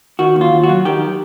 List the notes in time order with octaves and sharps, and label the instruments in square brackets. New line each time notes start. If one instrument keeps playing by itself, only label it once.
[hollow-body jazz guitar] D#3 F#4
D#2
F4
D#2
F#4
F#3
D#3 G4